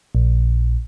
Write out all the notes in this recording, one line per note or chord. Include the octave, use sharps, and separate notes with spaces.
A#1